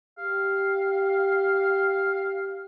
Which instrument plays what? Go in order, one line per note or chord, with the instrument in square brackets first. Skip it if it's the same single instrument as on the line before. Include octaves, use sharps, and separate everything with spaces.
[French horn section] G4 [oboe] F5